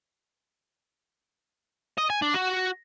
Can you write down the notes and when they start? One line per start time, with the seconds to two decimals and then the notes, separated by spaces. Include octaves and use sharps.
1.98 D#5
2.10 G#5
2.22 D4
2.34 F#4